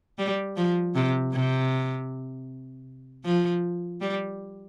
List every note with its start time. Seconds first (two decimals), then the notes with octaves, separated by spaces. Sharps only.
0.18 G3
0.57 F3
0.95 C3
1.33 C3
3.25 F3
4.01 G3